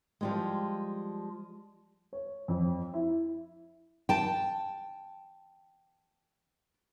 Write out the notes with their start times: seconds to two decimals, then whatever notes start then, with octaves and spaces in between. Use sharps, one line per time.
0.21 F3 G3 G#3
2.13 C#5
2.48 F2
2.94 E4
4.09 G5 A5